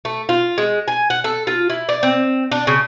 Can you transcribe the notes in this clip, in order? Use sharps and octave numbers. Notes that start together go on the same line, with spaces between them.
A3
F4
G#3
G#5
F#5
A4
F4
E4
D5
C4
D4
C#3